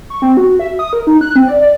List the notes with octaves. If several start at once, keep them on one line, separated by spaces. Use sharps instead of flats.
C#6
C4
F#4
E5
D#6
A#4
D#4
F#6
C4
D5
D5